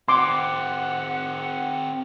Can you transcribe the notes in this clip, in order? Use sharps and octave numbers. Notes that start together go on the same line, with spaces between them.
C4 F#4 F#5 C6 D6